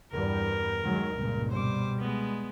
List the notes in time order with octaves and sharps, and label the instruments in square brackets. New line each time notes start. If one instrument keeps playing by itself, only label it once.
[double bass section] E2 G2 G3 [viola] A#4
[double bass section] D#3 F#3 G#3
C#2 G2 A#2
[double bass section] B2 G3 [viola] C5 D6
[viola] G#3 B3